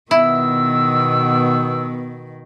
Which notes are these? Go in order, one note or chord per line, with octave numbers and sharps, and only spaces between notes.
B2 D#3 B3 E4 E6